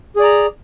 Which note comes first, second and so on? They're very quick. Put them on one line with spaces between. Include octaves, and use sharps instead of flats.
G#4 D5 A#5